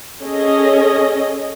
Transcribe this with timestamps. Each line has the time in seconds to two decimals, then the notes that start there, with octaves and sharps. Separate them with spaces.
0.23 C#4 G#4 A4 D#5